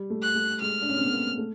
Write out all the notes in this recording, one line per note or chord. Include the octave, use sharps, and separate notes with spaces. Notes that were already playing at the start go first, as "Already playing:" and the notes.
Already playing: G3
A3
F#6
A3
G#3 F6
D4
C#4
C4
B3
A#3
A3